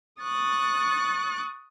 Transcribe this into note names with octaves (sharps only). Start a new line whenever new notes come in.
C#6 D#6 F#6 A6